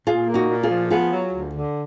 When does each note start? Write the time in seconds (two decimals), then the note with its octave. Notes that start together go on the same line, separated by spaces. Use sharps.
0.07 A#2 F4 G#4
0.27 A#3
0.34 D#4 F#4
0.49 A#2
0.63 F4 G#4
0.70 F3
0.90 B3 F4 G#4
1.13 F#3
1.33 D2
1.55 D3